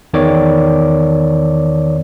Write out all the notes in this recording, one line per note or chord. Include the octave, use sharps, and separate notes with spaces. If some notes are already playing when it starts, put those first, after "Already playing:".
E2 D#3 C#5 D5 D6